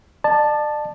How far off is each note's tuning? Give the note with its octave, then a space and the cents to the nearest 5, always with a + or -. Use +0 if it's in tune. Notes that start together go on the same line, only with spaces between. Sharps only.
D5 +40 A5 +0